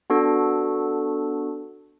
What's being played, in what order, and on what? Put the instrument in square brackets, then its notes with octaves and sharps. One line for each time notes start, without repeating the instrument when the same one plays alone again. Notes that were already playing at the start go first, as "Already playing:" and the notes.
[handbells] B3 D4 F#4 A4